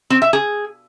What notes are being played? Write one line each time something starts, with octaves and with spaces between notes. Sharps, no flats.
C4
E5
G#4